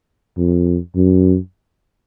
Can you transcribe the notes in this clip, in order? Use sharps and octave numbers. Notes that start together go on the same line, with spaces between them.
F2
F#2